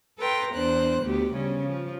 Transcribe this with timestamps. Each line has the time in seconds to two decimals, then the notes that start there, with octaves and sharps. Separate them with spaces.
0.19 A4 B4 G5 A#5 C6
0.53 E2 D4 C5 F#6
1.04 D2 B3 G4
1.34 C#3 G3 C#4
1.67 F3